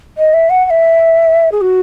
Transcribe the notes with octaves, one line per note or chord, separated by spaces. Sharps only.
D#5
E5
F#5
F#5
E5
G#4
F#4